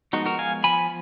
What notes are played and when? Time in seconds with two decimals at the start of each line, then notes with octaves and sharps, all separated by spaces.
0.13 F3 G#3 B3 D#4 F#4
0.26 F#4 A#4
0.39 F5 G#5
0.64 F3 B3 G#5 B5